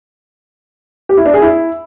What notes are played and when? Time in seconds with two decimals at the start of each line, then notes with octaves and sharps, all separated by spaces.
1.09 G4
1.17 E4
1.26 D4
1.34 G#4
1.42 E4